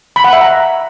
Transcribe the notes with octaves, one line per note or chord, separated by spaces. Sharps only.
B5
F#5
E5
A#5